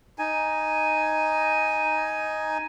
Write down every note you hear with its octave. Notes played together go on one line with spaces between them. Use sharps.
D#4 G#5